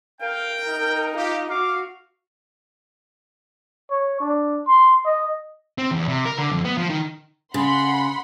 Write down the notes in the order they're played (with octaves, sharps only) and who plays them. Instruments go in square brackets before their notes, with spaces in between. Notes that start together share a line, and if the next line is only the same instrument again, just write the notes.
[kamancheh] A#4 [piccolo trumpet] F5 [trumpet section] G5
[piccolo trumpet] D#4
[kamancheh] F4 [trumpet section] G4
[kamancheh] F#4 [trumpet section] F5 [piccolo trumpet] D6
[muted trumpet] C#5
D4
C6
D#5
[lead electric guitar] C4
E2
C3
A#4
D3
F2
B3
F3
D#3
[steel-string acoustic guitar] C#3 [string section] F#5 B5 C6